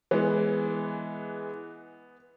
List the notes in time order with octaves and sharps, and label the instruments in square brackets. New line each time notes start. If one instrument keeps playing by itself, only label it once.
[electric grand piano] E3 G#3 [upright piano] B3